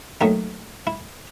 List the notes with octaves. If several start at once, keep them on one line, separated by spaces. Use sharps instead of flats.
D#2 D#3 F#3 A3 D#4
E4